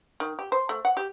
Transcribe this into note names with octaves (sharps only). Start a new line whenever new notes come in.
D#3
G4
C5
A3
F#5
G4